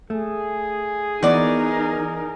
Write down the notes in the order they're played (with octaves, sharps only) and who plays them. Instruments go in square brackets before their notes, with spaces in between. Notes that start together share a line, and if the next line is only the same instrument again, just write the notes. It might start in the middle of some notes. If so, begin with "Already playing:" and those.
[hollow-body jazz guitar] A3 [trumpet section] G#4
[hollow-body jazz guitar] E3 B3 [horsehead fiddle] D#4 A#4 [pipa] F#4 D5